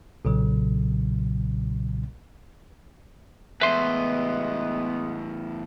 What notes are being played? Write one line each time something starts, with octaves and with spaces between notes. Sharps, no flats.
B1 A#2 C#3 F#3
E2 A2 G#3 B3 B4 E5 C6